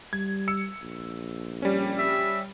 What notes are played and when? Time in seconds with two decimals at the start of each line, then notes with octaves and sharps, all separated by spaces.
0.13 G3 G#6
0.48 E6 C#7
0.82 A#1
1.62 G3 C#4
1.99 E5